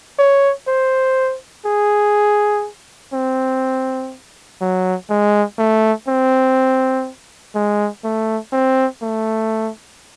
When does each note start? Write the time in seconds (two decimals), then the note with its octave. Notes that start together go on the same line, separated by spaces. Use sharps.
0.19 C#5
0.68 C5
1.66 G#4
3.13 C4
4.61 F#3
5.10 G#3
5.58 A3
6.08 C4
7.55 G#3
8.04 A3
8.52 C4
9.02 A3